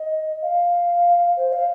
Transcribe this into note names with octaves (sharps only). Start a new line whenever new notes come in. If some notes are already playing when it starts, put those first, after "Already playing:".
Already playing: D#5
F5
C5
F5